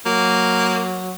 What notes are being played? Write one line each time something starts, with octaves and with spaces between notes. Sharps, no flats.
F#3 A#3